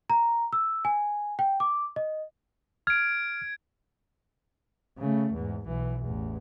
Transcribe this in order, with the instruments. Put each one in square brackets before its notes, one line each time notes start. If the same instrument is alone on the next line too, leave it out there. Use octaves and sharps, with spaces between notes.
[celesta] A#5
E6
G#5
G5
D6
D#5
[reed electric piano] F6 [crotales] G#6 D7
[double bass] C#3 A3
E2 G#2
B1 E3
A1 E2